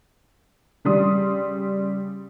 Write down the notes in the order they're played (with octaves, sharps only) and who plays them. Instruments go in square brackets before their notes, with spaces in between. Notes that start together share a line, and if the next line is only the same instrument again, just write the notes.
[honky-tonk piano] C#3 G3 C6 D#6